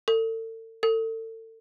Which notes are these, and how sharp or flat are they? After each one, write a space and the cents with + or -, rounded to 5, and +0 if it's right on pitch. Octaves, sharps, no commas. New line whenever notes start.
A4 +40
A4 +35